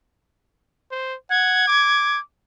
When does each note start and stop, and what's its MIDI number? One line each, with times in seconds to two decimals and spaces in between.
0.91 1.15 72
1.30 1.66 78
1.30 2.19 92
1.68 2.21 86